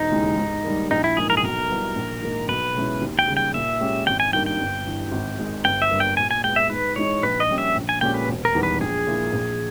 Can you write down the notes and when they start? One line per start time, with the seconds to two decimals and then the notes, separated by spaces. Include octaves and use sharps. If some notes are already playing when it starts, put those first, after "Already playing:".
Already playing: E1 D#4
0.12 D#2 C#3 E3 G#3
0.38 G#2
0.64 D#3 G3 A#3
0.91 A#1 D#4
1.04 E4
1.17 G#2 E3 A#3 D#4 G#4
1.30 A#4
1.37 G#4
1.43 B1 A#4
1.70 B2 G3 B3 E4
1.96 A#1
2.22 G#2 D#3 A#3 D#4
2.48 B1 B4
2.75 B2 G#3 C#4 E4
3.01 D#2
3.19 G5
3.28 C#3 G3
3.37 G5
3.54 A#2 E5
3.81 G#3 C#4 G4
4.07 G#1 G5
4.20 G#5
4.33 G2 D#3 A#3 G5
4.46 G5
4.60 G1
4.86 G2 E3
5.11 G#1
5.39 G#2 D#3 G#3
5.64 G1 G5
5.82 E5
5.91 G2 G3 A#3
6.00 G5
6.17 A#2 G#5
6.31 G#5
6.44 G#3 B3 G5
6.56 E5
6.70 G#2 B4
6.96 E3 G#3 D#4 C#5
7.23 A#1 B4
7.40 D#5
7.49 A#2 G3 C#4 G4
7.58 E5
7.76 A#1
7.89 G#5
8.01 A#2 G#3 C#4 G4 G5
8.14 B4
8.28 E1
8.45 A#4
8.55 E2 D#3 G3 B3
8.63 B4
8.81 A#1 G#4
9.07 A#2 A#3 E4
9.33 A#1